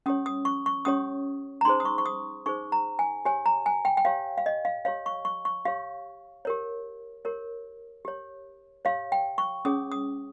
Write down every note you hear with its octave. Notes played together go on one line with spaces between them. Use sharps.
C#4 G4 C#5 D#6
D#6
C#6
C#6
C#4 G4 C#5 D#6
A#5
D#4 G#4 C5 C6
D#6
C#6
C#6
D#6
D#4 G#4 C5 C#6
A#5
G#5
G4 C#5 G#5
A#5
G#5
G5
G5
G4 C#5 F5
F5
D#5
F5
G4 C#5 F5
C#6
C#6
C#6
G4 C#5 F5
G4 A#4 C#5
G4 A#4 C#5
G4 C#5
G4 C#5 F5
G5
C#6
C#4 G#4 C#5 D#6
D#6